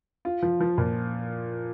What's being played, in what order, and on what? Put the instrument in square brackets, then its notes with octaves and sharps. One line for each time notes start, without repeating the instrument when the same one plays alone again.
[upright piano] F4
F3
F3
A#2